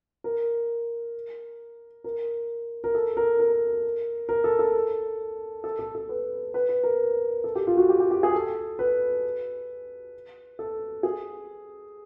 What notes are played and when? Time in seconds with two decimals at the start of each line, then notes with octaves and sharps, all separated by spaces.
0.24 A#4
2.04 A#4
2.84 A#4
2.95 A4
3.17 A#4
3.40 A#4
4.29 A#4
4.44 A4
4.59 A4
5.64 A4
5.79 A4
5.95 A4
6.09 B4
6.54 B4
6.69 B4
6.84 A#4
7.44 A4
7.55 G4
7.67 F4
7.77 F#4
7.89 G4
8.00 G4
8.11 G4
8.23 G#4
8.34 A4
8.79 B4
10.59 A4
11.03 G#4